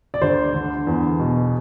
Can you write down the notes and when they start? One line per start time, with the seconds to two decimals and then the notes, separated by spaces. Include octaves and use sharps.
0.14 D5
0.21 D2 C5
0.54 D3
0.87 E2
1.20 B2